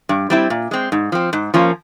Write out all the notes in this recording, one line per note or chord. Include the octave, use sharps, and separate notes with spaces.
G2
G3 C4 E4
A#2
G#3 C4
G#2
F3 C4
G#2
F3 A#3 C#4 F4